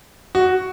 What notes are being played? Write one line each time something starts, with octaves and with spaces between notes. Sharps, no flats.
F#4